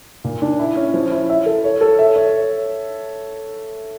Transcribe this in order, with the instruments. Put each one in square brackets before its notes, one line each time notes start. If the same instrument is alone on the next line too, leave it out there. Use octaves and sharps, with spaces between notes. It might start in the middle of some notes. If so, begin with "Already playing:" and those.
[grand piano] A#2
D4
E4
C#4
F3
E4
E5
A4
C#5
A4
E5
C#5